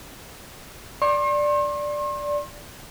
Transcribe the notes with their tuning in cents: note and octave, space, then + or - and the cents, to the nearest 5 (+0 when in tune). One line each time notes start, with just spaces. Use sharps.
D5 +0 C6 +45